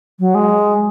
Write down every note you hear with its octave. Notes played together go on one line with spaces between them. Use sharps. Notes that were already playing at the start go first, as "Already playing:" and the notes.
F#3
G#3